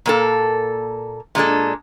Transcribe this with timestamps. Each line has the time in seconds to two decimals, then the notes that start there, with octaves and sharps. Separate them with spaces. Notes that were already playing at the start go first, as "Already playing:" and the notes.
0.06 A#2 A#3 A4
1.35 A#2 G#3 D4 A4